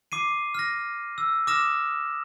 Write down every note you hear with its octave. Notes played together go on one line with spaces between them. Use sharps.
D6 C7 D#7
F6 A#6
E6
D6 D#6 F6 A#6 E7